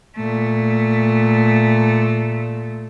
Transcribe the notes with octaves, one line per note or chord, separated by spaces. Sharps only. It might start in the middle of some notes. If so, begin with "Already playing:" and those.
A#2 A3